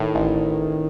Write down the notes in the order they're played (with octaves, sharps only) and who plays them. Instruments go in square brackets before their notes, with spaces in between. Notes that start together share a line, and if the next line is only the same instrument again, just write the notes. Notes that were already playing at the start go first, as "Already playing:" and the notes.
Already playing: [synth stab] A2 [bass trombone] D#3
[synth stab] A1